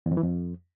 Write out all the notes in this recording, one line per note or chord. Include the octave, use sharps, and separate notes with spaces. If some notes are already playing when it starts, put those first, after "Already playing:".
E2
F2
E3
F2